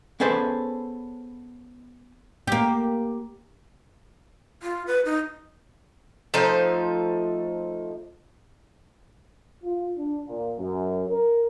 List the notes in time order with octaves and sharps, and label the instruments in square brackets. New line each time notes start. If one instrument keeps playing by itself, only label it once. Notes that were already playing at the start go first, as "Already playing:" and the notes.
[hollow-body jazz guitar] B3 C#4 G#4 A4 B4 C5
[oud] A#3 G4
[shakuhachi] F4
B4
D#4
[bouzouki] F3 A3 D#4 C5
[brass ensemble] F4
D4
A#2
F#2
A#4